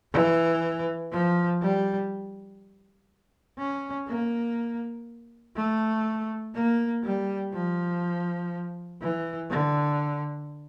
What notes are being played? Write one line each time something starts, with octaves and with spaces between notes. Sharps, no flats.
E3
F3
G3
C#4
A#3
A3
A#3
G3
F3
E3
D3